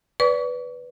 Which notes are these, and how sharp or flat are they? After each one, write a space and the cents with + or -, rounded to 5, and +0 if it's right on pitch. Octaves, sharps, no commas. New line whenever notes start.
B4 +0 D5 -20 C#6 +45